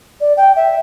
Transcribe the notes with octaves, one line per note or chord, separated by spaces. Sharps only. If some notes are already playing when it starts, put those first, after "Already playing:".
D5
G5
E5